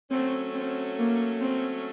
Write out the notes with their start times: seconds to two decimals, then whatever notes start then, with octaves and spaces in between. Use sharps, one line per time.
0.11 F#3 A3 C4 C#4
0.54 C4
0.98 A#3
1.41 C4